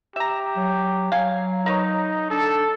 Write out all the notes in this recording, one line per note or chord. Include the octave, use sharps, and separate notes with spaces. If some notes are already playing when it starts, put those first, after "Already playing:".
G4 E5 A#5
F#3
F#3 F5 G#5
D#4 A#4 B4 C#5
D4 A4